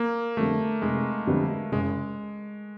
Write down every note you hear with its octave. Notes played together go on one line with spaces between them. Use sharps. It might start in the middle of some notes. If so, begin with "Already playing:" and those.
Already playing: A#3
F2 D3 G3 A3 B3
F1 G#3
F2 D3 G3 B3
F#1 G#3